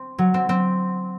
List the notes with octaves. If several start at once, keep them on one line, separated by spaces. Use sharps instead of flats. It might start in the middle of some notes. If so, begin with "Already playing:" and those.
Already playing: C4
F#3
C4
C4